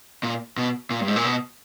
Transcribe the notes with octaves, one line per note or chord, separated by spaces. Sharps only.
A#2
B2
A#2
G2
G#2
A#2
B2